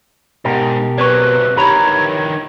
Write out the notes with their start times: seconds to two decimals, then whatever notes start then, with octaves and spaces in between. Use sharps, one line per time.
0.45 G#2 B2 G4 A#4
0.98 C3 F#3 B4 D5 C#6
1.57 D#3 E3 G4 C#5 A#5 B5 C#6